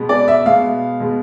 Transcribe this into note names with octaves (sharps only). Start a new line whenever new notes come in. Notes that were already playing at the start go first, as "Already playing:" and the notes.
Already playing: B2 G#3 B3
D5
E5
B2 G#3 B3 F5
B2 G#3 B3